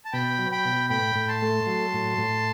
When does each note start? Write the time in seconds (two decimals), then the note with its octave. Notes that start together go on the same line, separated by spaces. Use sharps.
0.05 A5
0.12 B2 G5 B5
0.39 F#3
0.52 G5 B5
0.65 B2
0.90 A2 G5 B5
1.15 A2
1.28 A5 C6
1.42 A3
1.67 F#3
1.93 A2
2.18 A2